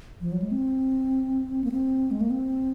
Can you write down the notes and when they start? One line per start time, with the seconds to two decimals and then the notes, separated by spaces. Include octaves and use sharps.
0.21 F3
0.32 F#3
0.42 G#3
0.52 C4
1.64 A#3
1.72 C4
2.11 G#3
2.21 A#3
2.30 C4